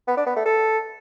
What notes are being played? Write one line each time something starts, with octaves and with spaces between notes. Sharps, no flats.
B3
D4
B3
A3
A4